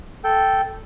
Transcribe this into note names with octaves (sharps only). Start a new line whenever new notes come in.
A4 G5